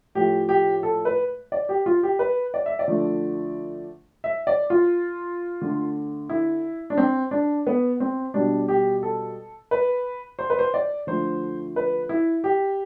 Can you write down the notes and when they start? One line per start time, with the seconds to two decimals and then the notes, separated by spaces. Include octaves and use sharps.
0.15 A2 F3 A3 G4
0.49 G4
0.83 A4
1.05 B4
1.52 D5
1.69 G4
1.86 F4
2.03 G4
2.19 B4
2.54 D5
2.66 E5
2.79 D5
2.88 D3 F3 A3
4.24 E5
4.47 D5
4.70 F4
5.61 D3 A3
6.29 E4
6.90 D4
6.97 C4
7.31 D4
7.67 B3
8.00 C4
8.34 B2 G3 D4
8.68 G4
9.03 A4
9.71 B4
10.39 C5
10.50 B4
10.59 C5
10.74 D5
11.07 D3 F3 A3 C5
11.76 B4
12.09 E4
12.44 G4